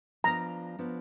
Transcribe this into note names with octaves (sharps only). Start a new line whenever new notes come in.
F3 B3 D4 A#5
F3 B3 D4